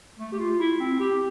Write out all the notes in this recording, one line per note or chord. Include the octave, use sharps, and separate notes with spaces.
A3
G4
F4
E4
C4
G4